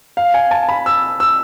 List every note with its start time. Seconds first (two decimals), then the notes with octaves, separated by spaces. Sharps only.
0.17 F5
0.34 G#5
0.51 A5
0.69 B5
0.86 E6
1.20 E6